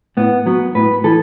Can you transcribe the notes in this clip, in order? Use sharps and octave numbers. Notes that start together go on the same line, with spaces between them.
A2 B3
F#3 B3
A2 B4
E3 A4